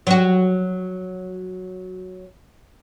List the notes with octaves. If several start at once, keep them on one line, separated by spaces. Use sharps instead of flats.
F#3 F#4